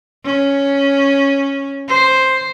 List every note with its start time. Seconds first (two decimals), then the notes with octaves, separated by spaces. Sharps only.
0.25 C#4
1.88 C5